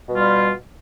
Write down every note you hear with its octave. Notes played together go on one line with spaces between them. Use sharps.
B2 G3 F4